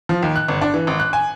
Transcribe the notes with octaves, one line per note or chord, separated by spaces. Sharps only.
F3
D#2
F#6
G1
D4
E3
G#1
F#6
G#5